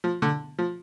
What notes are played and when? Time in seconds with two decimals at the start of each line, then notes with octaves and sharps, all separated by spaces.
0.04 F3
0.22 D3
0.59 F3